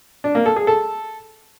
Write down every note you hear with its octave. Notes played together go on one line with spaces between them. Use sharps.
D4
A#3
A4
G#4
A4